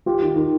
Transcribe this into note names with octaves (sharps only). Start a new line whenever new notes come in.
F4 G4
D#3
D#3